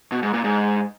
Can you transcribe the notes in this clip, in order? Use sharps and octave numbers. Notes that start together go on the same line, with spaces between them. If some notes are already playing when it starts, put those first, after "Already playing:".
B2
G#2
A#2
G#2